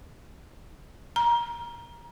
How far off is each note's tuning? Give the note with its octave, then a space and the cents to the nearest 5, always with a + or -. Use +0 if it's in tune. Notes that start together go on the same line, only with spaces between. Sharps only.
A#5 +20